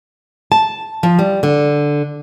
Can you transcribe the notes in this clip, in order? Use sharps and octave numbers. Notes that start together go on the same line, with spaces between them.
A5
F3
G3
D3